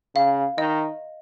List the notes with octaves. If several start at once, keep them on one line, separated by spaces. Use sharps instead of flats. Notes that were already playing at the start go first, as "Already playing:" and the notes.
C#3 F5
D#3 D#5